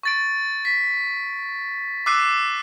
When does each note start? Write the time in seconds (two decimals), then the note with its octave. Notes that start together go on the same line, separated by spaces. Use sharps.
0.03 C#6 A6 D7
0.65 B6
2.06 D6 E6 F#6 C7 D#7